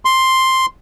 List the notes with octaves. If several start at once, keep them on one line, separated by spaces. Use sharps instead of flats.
C6